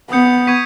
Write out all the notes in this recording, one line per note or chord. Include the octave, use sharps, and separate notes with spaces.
B3 D#6 G6 C#7
C#6 G#6 B6 D#7